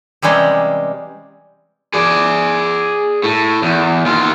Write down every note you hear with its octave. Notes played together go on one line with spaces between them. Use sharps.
C3 E3 G3 G#3 C#4
G#4 D5
A2
E2
D#2 F4